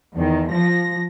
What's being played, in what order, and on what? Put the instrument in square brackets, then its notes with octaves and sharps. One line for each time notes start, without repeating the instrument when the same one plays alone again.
[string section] E2 D#3
F3 A#6